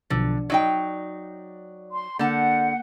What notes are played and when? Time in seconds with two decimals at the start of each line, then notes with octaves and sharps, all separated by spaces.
0.10 B1 B2 D3 F3
0.50 F#3 D#4 D5 G5
1.92 C6
2.19 D3 A#3 F#5 A5 G6